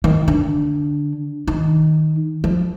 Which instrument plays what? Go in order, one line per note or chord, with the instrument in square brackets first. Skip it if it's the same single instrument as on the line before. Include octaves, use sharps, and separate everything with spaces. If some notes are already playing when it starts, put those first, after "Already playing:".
[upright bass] D#3
D3
D#3
F3